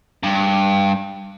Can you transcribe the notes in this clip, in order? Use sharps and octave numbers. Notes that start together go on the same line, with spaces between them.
G2